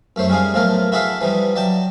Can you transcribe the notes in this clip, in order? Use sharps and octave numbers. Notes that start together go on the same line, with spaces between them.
F#2 A3 C5 C#5
G3 C#4 D#4 G#4 F5
B1 A2 F3 A3 F4 A#4
E4 F#4 G#4 A4 E5 F5
E3 F3 G3 D#4
F#3 D5 G5 A5